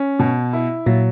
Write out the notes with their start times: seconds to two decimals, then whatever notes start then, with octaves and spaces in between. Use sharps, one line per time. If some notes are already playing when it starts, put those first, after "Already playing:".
Already playing: C#4
0.19 B2
0.53 E4
0.86 A#2 F#3